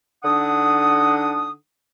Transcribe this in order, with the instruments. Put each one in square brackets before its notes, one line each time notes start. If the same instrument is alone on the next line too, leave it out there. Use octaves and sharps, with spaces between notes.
[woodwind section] D3 D4 D#4 F#5 D#6